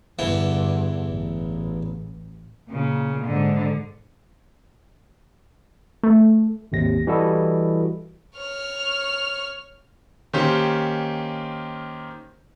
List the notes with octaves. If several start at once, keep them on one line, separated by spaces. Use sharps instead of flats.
E2 G2 D3 E3
A1
A#2 C#3
G#2 D3
A3
G#1 D#2 C3 A#6
E3 G3 E4 F#4 A4 D#5
C#5 F6
D#3 A#3 C#4 G4 C5